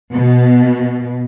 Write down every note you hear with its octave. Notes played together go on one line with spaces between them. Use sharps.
B2